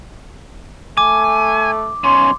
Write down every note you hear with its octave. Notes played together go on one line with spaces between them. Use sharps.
A3 G#5 D6
B1 C#4 C6